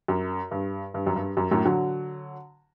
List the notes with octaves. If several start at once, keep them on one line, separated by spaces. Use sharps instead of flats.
F#2
G2
G2
F#2
G2
F#2
F#2 A2
D3 F#3